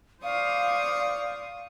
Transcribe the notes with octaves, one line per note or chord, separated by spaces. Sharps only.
C5 D5 F5 C#6 D#6